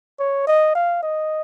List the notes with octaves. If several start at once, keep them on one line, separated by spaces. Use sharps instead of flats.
C#5
D#5
F5
D#5